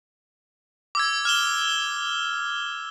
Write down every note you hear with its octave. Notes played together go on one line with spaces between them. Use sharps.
D6 E6 G#6
F6 E7 G7